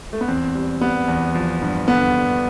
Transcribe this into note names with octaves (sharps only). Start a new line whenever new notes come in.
A3
B3
E2 C4
G3
G3 B3
E2
F3
G2
D3 B3
D3